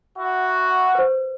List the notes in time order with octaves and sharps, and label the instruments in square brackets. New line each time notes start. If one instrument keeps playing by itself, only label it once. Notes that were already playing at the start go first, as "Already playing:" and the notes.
[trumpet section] E4 F#4
[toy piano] B4 C5